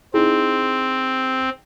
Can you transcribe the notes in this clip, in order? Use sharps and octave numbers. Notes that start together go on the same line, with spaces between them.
C4 D#4 E4 G#4